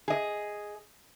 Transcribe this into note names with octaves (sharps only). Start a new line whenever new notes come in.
G#4 D#5